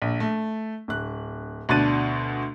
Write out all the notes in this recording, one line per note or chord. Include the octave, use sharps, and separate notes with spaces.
A#1
A3
D1 F#6
D2 B2 D4 F#6 A6 D#7